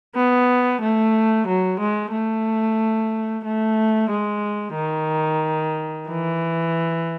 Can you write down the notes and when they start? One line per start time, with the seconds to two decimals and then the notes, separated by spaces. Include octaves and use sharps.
0.15 B3
0.81 A3
1.47 F#3
1.80 G#3
2.12 A3
3.44 A3
4.10 G#3
4.75 D#3
6.08 E3